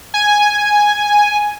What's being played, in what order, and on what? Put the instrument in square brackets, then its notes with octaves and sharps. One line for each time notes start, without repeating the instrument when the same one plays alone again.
[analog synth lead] G#5